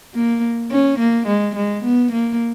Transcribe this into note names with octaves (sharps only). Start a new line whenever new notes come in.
A#3
C#4
A#3
G#3
G#3
B3
A#3